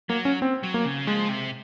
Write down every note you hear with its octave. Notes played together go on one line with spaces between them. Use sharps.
F#3 A#3
C#4
C4
F#3
A#3
C#3
F3 G#3
C3